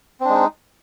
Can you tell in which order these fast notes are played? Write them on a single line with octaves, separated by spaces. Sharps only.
C4 D4 G#3 D#4